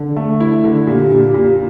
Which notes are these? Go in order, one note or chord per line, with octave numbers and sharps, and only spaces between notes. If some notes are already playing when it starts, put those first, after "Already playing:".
Already playing: D3
A3
E4
D3
A#2 G4
A#2
A#2